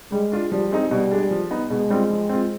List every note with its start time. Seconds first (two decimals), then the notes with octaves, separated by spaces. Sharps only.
0.12 G3 G#3
0.32 D4 F4
0.51 F3 G3
0.72 G#3 C4 D#4
0.91 B2 G3
1.11 G#3 D4
1.31 F3
1.51 B3 D#4
1.70 B2 G#3
1.90 G3 C4 F4
2.10 F3
2.29 C4 F4